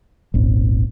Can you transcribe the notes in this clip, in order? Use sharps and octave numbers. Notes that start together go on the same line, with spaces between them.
D#1 G#1